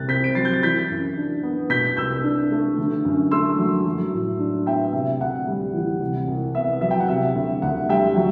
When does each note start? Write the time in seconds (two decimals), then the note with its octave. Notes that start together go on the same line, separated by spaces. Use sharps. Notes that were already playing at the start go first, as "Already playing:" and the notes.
Already playing: C2 C3 F#6 A6
0.08 C4 G6 B6
0.24 D7
0.35 F#3 A6 C7
0.45 G6
0.53 A6
0.62 E3 G6 B6
0.90 F#2
1.17 D4
1.43 B3
1.70 B2 G6 B6
1.97 C2 E6 G6
2.24 D4
2.52 A3
2.78 D3
3.05 F#2
3.31 A3 C6 E6
3.58 F#3
3.85 F#3
4.13 A2
4.39 D4
4.66 B3 E5 G5
4.93 C3 E5
5.20 D2 F#5
5.47 G3
5.74 E3
6.01 C3
6.28 C2
6.55 B3 E5
6.81 F#3 E5
6.91 G5
7.00 F#5
7.08 C3 E5
7.35 D2
7.62 D2 F#5
7.89 G3 E5 G5
8.16 F#3